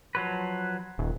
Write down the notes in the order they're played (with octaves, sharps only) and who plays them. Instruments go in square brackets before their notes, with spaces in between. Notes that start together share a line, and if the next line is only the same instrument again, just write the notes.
[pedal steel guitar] F3 F#3 B4
[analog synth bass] D#1